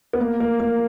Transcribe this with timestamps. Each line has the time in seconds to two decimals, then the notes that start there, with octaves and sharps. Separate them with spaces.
0.13 B3
0.20 A#3
0.40 A#3
0.60 A#3